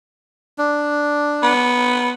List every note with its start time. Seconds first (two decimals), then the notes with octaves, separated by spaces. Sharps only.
0.58 D4
1.43 B3